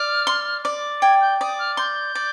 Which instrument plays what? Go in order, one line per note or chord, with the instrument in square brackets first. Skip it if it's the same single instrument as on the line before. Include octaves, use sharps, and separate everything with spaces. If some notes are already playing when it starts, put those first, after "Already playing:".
Already playing: [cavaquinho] D5 [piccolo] F6
[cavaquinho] C6
D5
[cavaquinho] G5 [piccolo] G#6
[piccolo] G6
[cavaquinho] D5 [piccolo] D#6
[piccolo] F6
[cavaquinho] C6 [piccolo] G6
[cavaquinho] D5